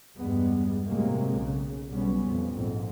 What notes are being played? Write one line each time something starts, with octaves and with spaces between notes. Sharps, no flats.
E2 G2 G3 G#3 B3
A2 C3 F#3 G#3 A#3
B1 C#3
B1 G3 B3 C#4
F2 A#2
A#1 F2 G#2